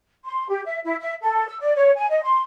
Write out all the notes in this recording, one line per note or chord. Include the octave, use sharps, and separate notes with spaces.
C6
G4
E5
E4
E5
A4
E6
D5
C#5
G#5
D#5
C6